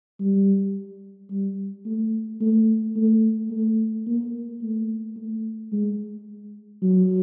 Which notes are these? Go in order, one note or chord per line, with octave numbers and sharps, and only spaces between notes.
G3
G3
A3
A3
A3
A3
A#3
A3
A3
G#3
F#3